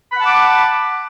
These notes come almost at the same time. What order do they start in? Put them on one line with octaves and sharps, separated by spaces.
B5 F#5 A5 D6